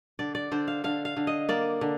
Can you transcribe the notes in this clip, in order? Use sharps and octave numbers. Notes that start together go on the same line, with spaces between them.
D3 D5
D5
D3 C5
F5
D3 F5
F5
D3
D#5
A#3 D5
D3